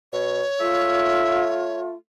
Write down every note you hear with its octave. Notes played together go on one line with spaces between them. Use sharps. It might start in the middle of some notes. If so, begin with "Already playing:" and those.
B2 C#5
A3 F4 E5